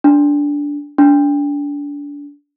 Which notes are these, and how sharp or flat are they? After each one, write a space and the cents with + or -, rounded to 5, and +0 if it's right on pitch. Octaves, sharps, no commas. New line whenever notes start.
D4 -15
D4 -30